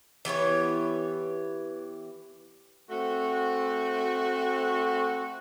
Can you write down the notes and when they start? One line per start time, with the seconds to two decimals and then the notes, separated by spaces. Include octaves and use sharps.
0.25 E3 B3 G4 C#5
2.90 A3 C4 F#4